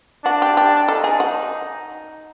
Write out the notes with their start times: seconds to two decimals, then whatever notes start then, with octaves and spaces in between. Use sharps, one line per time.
0.25 D4 F#4
0.42 G4
0.57 G4
0.88 D#4 A4
1.04 G#4
1.20 F#4